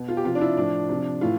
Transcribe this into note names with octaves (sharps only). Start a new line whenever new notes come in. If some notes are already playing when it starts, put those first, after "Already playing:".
Already playing: B2
F4
G4
C3 F3 F4
D4
E4
A2 F3 D4
C3 F3
A2 E3 F4